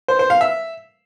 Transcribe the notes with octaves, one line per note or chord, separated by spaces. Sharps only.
C5
C5
F5
E5